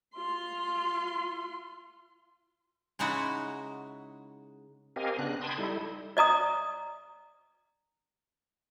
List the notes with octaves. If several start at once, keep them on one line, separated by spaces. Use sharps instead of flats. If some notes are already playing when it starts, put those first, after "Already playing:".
F4 C6
C#3 G#3 D#4 E4 F#4
C4 G4 A#4 D#5 F5 G#5
C#3 B3 D4 F#6
G5 A5 B5 C6 D#6 G#6
G3 D#4 E4 A4
D5 D#5 A#5 D#6